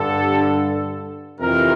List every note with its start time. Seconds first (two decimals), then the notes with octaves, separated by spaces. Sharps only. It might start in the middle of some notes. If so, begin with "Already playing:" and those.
Already playing: G2 D3 A4
1.39 F2 C3 E3 A#4